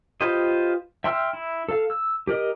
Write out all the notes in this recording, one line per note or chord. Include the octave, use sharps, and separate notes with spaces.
F4 G4 B4 C5 D#5
E5 G5 C6 E6 F6
E4
A4 F5
E6
G4 A#4 D#5